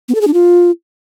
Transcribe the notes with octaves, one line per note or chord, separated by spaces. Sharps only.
B3
A4
G#4
D4
F4